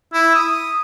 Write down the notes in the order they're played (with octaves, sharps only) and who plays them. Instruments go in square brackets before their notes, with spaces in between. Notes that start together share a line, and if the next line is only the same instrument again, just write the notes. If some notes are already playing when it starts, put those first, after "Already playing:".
[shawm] E4
D#6